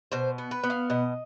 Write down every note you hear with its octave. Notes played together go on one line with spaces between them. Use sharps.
B2 C5
B3
B4
B3
F5
B2 D#5